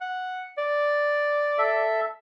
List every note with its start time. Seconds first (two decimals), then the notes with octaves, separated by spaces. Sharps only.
0.01 F#5
0.58 D5
1.58 A4 E5